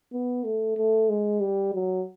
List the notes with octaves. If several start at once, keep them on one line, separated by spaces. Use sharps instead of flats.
B3
A3
A3
G#3
G3
F#3